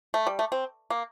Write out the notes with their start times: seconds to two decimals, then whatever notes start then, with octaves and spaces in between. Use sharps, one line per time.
0.14 A3
0.27 G3
0.39 A3
0.52 C4
0.90 A#3